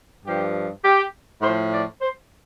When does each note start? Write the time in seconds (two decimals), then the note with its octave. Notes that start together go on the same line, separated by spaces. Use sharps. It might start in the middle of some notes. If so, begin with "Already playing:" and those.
0.24 G2 F3 G4
0.83 G4
1.41 A2 F3 C5
1.71 D5
2.00 C5